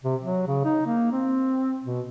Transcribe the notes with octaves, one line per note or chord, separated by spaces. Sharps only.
C3
F#3
C#3
D#4
A#3
C4
B2